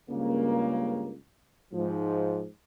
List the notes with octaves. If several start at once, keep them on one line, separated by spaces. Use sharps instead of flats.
C#2 G2 C#3 A#3
G#2 F3